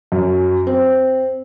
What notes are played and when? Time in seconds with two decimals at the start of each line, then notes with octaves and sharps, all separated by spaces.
0.12 F#2
0.67 C4